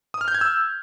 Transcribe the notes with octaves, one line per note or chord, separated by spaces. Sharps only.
D#6
F6
G6
G#6
E6